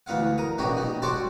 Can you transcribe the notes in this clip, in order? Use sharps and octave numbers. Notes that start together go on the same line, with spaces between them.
D2 E3 B3 F5 F#5
A#4 D#6
A#1 B2 G3 C#4 F#4 G4
G3 D#4
G3 F#4 C5 D5 F#5 A5